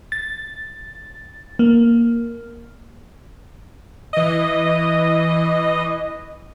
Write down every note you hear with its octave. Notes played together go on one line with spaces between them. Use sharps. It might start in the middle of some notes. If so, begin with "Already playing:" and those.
A6
A#3
E3 D#5